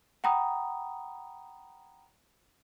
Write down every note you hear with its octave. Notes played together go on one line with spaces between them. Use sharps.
F#5 G5 A#5 B5 D#6